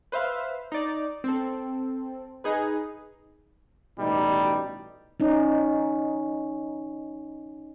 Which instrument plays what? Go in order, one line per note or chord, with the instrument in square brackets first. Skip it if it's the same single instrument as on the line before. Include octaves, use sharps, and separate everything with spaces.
[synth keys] B4 C5 E5 F5
D#4 D5
C4 A4
D#4 G#4 B4
[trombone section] A1 B2 D#4 [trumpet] G3
[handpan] C#4 D#4